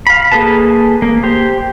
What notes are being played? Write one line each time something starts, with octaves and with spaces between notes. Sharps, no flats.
F5 B5
A#3 G#4 A4 B4 A5
A#3
G4 C5